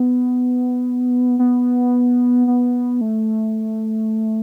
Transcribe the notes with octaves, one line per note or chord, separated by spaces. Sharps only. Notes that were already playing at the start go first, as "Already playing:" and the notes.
Already playing: B3
B3
B3
A3